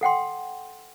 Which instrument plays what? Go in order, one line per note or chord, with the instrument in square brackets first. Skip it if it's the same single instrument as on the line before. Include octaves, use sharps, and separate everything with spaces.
[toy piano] A4 F#5 G5 C6